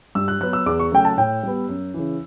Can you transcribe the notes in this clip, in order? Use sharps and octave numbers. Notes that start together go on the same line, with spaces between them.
G2 E6
F#6
F#3 B3 F#6
E6
E2 D6
C#6
C#3 F#3 A3 G5
A5
A2 G5
G3 B3
F#2
C#3 E3